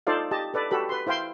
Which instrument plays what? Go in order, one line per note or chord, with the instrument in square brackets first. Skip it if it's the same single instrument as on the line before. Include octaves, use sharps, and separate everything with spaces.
[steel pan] D#4 F4 A4 C5 D5 F5
G4 D#5 A5
A4 B4 D5
F#4 G4 A4 B4 B5
B4 C6
E4 C5 F5 G5 C6